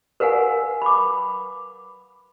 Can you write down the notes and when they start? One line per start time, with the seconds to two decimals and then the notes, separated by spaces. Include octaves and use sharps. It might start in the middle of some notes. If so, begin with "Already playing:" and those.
0.20 A#4 B4 F5 F#5 G#5
0.82 B5 D6